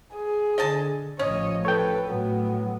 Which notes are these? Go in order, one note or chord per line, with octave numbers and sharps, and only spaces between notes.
G#4
D3 D#5 G#5 A5
A1 F3 C#4 C#5 D#5
A4 B4 C#5 G5
A2 F#3 B3